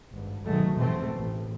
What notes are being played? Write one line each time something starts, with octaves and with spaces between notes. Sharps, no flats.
G#1 G2
D2 B2 D#3 F#3 G#3 A3
F1 G#2 B2 E3 A3 C4
A1